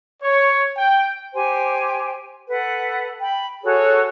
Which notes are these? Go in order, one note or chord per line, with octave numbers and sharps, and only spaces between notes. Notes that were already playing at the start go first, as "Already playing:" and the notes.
C#5
G5
G4 C5 G#5
A4 B4 F#5
G5 B5
F#4 G#4 A4 C#5